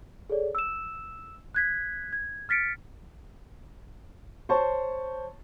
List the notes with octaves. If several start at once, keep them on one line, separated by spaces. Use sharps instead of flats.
G#4 A4 C#5 D5
E6 E7
F#6 G#6 B6
G#6
F6 A6 B6 C#7 D7
C5 C#5 A5 C#6